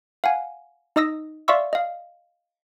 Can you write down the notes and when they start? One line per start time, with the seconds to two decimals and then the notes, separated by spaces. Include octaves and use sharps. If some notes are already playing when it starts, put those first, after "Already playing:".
0.24 F5 F#5 G#5
0.96 D#4 D#5 D#6 E6 A#6
1.48 D5 E5 F5 C6 C#6 E6
1.73 D#5 F5